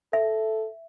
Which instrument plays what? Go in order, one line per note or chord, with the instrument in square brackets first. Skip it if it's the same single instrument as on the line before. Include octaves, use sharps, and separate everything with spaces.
[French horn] A4 [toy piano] E5